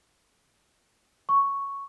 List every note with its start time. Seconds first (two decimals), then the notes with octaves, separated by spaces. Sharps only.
1.29 C#6